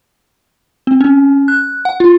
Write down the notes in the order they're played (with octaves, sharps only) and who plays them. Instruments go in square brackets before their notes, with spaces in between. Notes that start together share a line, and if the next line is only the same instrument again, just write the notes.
[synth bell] C4
C#4
F#6
F#5
F4